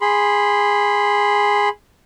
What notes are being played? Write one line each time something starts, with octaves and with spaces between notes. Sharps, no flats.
G#4 B5 C6